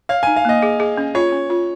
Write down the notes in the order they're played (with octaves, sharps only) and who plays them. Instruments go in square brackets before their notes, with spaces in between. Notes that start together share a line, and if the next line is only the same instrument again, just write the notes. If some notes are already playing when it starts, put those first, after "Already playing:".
[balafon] C#5 [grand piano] F5
[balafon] D#4 [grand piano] G#5
[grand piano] F5
[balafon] A#3 [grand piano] D#5
[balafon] G#4
G#4
C#4
[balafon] F4 [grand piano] C#5
[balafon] C#4
F4